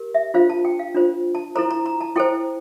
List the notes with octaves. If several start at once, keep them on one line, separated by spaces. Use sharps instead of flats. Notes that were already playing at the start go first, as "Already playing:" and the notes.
Already playing: G4 A#4
E5
D4 F4 C5 F5
A5
G5
F5
D4 F4 C5
A5
E4 A4 C5 A#5
A#5
A#5
A5
E4 A4 C5 G5